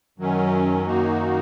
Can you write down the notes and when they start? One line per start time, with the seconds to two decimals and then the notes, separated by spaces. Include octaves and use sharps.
0.18 F#2 D#3 F#3 C#4
0.87 F#2 D#3 A#3 D#4 F#4